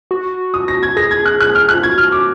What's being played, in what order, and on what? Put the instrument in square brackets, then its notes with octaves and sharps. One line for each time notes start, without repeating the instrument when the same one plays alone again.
[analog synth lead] F#4
[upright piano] D#6
A#6
G#6
[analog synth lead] G#4 [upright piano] A#6
[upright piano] G#6
F#6
F#6
F6
F#6
[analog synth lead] F4
[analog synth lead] F#4 [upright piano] G#6
[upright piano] F6
D6